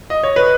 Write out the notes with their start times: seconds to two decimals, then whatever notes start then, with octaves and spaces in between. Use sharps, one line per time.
0.10 D#5
0.23 C#5
0.36 B4